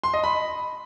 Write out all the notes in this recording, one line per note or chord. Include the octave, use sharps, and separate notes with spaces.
C6
D#5
B5